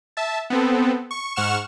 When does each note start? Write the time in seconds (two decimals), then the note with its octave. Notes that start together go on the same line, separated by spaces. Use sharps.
0.17 E5 A5
0.50 B3 C4 A4
1.11 C#6
1.36 G#2 F#5 C#6 F6 E7